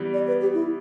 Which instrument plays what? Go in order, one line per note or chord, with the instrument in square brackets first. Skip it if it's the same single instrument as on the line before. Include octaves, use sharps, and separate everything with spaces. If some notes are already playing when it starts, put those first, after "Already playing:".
Already playing: [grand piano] E3 G3 B3
[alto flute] D5
B4
G4
E4